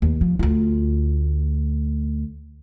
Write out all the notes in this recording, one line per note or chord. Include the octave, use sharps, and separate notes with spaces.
D#2
F3
D2 F4